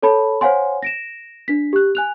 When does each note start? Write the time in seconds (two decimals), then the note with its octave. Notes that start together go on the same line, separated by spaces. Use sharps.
0.02 A4 C#5 A5 B5
0.41 C5 C#5 F5 F#5 G#5 C6
0.82 A#6 D7 E7
1.48 D4 B6
1.73 G4 F#6
1.95 G#5 F#6 F7